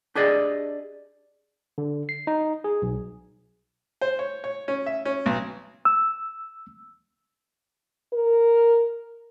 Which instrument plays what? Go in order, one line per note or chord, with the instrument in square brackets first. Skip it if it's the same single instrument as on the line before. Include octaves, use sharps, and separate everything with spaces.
[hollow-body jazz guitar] D4 G4 G#4 D5 D#5
[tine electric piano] D3
C7
D#4
G#4
B1
[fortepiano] C5
C#5
C#5
C#4
E5
C#4
B1
[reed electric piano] E6
[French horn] A#4